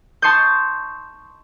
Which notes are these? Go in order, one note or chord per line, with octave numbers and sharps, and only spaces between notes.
A5 C6 C#6 D#6 G6